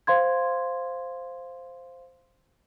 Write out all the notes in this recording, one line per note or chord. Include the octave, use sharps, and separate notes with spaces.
C5 F5 C6 G#6